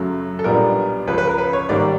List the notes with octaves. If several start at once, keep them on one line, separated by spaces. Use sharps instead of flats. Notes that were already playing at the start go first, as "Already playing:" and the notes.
Already playing: F#2 C#3 F#3 A3
A4
B1 A#2 G3 B3 D4 A#4
C#2 C#3 F3 B4
B4
A#4
B4
C#5
G#2 D#3 G3 A#3 D5